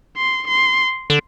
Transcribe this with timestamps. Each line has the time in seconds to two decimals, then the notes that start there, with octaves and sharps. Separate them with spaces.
0.16 C6
0.48 C6
1.10 D3